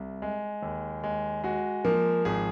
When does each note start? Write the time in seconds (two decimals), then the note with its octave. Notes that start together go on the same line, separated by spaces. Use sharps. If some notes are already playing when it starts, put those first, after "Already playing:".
Already playing: C2
0.22 G#3
0.63 D#2
1.04 G#3
1.44 G#3 F#4
1.85 F3 A#3
2.25 G#1 G#4